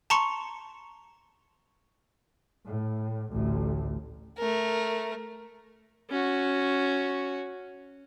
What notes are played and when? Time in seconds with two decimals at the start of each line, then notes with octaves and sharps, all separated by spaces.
0.10 A5 A#5 C6 C#6 C#7
2.65 A2
3.32 A1 D2
4.38 A3 A#4
6.10 C#4 F#4